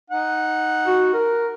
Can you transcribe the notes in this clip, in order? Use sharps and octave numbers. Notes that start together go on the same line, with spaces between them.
D#4 F#5
F#4
A#4